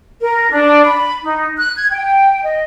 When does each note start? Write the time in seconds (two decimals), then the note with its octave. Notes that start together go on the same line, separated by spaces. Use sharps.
0.21 A#4
0.50 D4
0.85 B5
1.23 D#4
1.58 F#6
1.76 G#6
1.91 G5
2.44 D#5